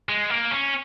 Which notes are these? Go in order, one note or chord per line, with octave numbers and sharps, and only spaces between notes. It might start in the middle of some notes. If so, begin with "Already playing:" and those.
G#3
A#3
C#4